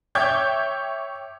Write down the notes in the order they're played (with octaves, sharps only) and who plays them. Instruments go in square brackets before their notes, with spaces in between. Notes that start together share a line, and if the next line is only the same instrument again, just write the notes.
[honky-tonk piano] C#5 E5 G5 D6 G6 G#6